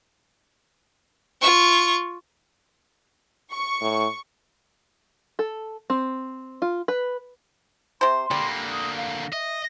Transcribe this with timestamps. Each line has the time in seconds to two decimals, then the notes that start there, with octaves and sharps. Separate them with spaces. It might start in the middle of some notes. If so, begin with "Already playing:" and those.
1.41 F4 C#6
3.51 C#6
3.81 A2
5.39 A4
5.90 C4
6.62 F4
6.88 B4
8.01 C3 C5 C6
8.31 D3 G3 A#3
8.71 D#6
8.97 F5
9.33 D#5 E5